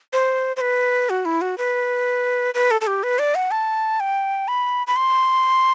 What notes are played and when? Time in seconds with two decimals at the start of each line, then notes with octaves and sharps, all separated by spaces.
0.13 C5
0.57 C5
0.61 B4
1.10 F#4
1.25 E4
1.41 F#4
1.58 B4
2.55 B4
2.71 A4
2.81 A4
2.87 G4
3.03 B4
3.19 D5
3.35 F#5
3.51 A5
4.00 G5
4.48 B5
4.87 B5
4.96 C6